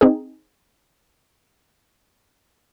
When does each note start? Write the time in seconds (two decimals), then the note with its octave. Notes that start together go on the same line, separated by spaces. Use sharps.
0.01 C4 D#4 G#4